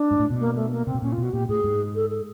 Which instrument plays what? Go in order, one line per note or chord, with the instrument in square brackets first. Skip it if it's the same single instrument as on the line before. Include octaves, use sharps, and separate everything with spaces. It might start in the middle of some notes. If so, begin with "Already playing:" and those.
Already playing: [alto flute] D4
[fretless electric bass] G#2
A2
B2
[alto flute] A#3
A3
A#3
[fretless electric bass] C3 [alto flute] C4
[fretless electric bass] B2
[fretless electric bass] A#2 [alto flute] C#4
[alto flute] F4
[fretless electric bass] B2 [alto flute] F#4
[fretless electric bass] A#2 [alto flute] G4
[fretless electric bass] A2 [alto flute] G#4
[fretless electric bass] G#2
[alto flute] A4
A4